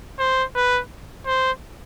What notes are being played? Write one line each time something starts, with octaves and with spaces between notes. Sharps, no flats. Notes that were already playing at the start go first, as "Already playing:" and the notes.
C5
B4
C5